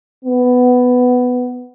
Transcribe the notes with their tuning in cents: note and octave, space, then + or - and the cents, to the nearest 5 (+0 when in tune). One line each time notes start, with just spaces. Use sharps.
B3 +10